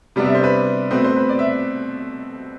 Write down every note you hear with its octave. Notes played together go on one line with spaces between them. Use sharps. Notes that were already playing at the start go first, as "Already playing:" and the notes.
C3 G3 B3 D4
E5
C5
B4
B2 A3 C4 B4
C5
B4
D5
E5